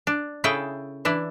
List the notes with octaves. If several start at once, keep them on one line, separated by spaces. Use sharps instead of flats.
D4
C#3 E4 G#4 A4 G5
E3 D4 E4